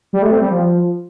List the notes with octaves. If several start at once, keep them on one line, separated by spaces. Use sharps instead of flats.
G3
A3
C4
G3
F3